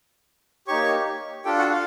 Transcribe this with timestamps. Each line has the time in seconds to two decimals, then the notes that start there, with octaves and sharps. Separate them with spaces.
0.67 A#3 D#4 G4 C#5 C#6
1.45 D4 F4 G4 A4 G5
1.58 F#4 F#5
1.70 F4 F5